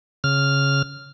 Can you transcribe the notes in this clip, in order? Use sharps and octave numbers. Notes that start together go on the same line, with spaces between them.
C#3 F6